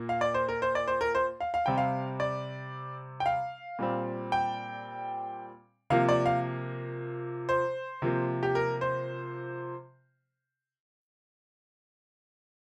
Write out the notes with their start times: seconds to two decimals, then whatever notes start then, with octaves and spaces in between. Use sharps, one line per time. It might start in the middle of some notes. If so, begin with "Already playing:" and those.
Already playing: A#2 A#3
0.09 F5
0.21 D5
0.34 C5
0.48 A#4
0.62 C5
0.75 D5
0.88 C5
1.01 A#4
1.15 C5
1.40 F5
1.54 F5
1.66 C3 G3 C4 G5
1.78 F5
2.20 D5
3.20 G5
3.26 F5
3.79 A#2 G3 C4
4.32 G5
5.90 C3 F3 A#3 F5
6.09 D5
6.26 F5
7.49 C5
8.02 C3 F3 A#3
8.43 G4
8.55 A#4
8.81 C5